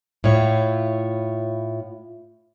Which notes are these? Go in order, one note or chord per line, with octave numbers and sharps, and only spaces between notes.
A2 E4 F4 C#5